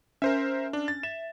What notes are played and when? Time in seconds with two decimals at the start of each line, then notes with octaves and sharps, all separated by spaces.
0.22 C#4 A#4 C5 E5
0.73 D4
0.88 A6
1.03 E5 E7